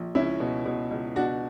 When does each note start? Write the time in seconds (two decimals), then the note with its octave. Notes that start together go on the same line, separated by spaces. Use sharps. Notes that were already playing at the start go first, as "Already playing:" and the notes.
Already playing: A#1
0.15 C#2 C#4 E4
0.40 B2
0.66 B2
0.91 C#2
1.16 B2 D4 F#4